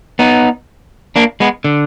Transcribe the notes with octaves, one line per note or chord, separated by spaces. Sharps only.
B3 D#4
A#3 D4
G#3 B3
D3